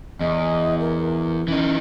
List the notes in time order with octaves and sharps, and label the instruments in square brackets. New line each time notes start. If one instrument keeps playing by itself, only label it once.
[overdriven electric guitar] E2 [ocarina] D#5
[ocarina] A#4
[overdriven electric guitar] E3 D#4 [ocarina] C#4